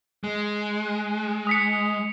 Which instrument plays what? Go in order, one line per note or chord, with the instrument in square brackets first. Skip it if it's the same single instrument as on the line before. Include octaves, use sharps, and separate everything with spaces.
[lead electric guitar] G#3
[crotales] D#6 B6 C#7